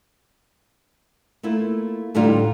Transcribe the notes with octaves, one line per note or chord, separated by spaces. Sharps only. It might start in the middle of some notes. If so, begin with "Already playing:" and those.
A3 A#3 E4 F4
A2 D3 G3 D#4 F4